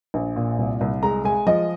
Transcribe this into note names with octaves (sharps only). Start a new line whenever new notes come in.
A#1
A#2
C2
C2
G#3 A#5
G#3 G#5
F3 D#5